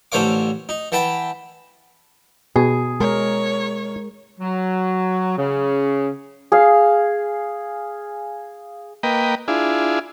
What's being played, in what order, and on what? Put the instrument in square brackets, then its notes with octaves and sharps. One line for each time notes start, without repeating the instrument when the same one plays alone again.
[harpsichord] A1 D3 C5 C#5 F5 D6
D#4
E3 F#5 G5 A5 B5
[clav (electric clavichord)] B2 [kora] G#4
[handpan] G#3 A#4 [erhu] C#5
[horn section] F#3
C#3
[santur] G#4 F5
[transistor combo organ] A#3 B4 D#5 G5
D4 E4 F4 G#4